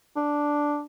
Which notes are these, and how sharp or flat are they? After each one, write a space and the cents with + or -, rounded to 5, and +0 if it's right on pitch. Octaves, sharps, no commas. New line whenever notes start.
D4 +0